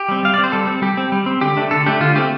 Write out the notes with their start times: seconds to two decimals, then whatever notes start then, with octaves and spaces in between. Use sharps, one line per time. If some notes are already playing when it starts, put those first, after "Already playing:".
Already playing: G4
0.08 G3 C4
0.23 G3 F5
0.34 D5
0.38 C4
0.44 C5
0.52 G3 A4
0.67 C4
0.82 G3 G4
0.97 C4
1.12 G3
1.26 C4
1.41 D3 G4
1.57 A3 D4
1.71 D3 A4
1.86 A3 D4 G4
2.01 D3 F4
2.15 A3 C4 G4